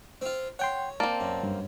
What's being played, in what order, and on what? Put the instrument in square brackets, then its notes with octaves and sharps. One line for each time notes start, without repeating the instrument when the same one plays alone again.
[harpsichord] C4 F4
[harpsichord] C#5 [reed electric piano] F#5 G5 C6
[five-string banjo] A#3 C4 [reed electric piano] D5 A5
[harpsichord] F#2
[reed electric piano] G2